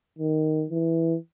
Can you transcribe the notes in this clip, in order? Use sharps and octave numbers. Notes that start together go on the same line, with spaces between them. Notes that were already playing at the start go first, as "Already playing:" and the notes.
D#3
E3